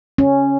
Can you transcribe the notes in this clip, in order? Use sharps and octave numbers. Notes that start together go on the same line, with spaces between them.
C#4